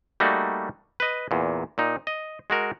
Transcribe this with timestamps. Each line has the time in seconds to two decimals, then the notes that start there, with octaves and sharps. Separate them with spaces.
0.20 G3 A3 A#3 D#4 F#4
1.00 B4 D#5
1.31 E2 A#2
1.78 A#2 D#4
2.07 D#5
2.50 G#3 F#4 A#4